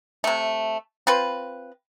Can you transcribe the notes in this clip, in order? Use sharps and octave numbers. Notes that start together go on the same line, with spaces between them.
C3 A3
C4 F4 B4